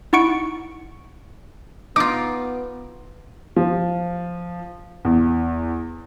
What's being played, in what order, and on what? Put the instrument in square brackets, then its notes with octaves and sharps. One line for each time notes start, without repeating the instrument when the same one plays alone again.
[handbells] D#4 E4 F#5 C#6 C#7 D7
[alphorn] B3 [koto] D#4 F4 [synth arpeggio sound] D6
[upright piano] F3
E2